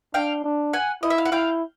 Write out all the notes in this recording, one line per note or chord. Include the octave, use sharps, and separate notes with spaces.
D4 F5 G5
D4
F#5 G#5
E4 D#5
E5
F5
F#5
E4 F5 G5